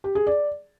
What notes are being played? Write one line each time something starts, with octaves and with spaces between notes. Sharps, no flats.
G4
G#4
D5